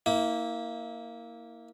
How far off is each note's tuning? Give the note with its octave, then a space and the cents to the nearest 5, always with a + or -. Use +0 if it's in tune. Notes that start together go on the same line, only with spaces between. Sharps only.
A#3 -5 E4 -30